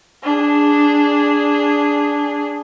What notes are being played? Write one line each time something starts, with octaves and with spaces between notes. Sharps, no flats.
D4 G#4